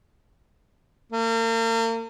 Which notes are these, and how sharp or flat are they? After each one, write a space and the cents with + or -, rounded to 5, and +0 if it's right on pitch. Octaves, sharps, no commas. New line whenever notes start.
A#3 -40